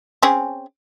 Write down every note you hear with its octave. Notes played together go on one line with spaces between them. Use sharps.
C4 C#4 G#4